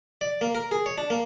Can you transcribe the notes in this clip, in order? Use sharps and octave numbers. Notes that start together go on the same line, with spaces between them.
D5
A#3
A#4
G#4
C#5
D4
A#3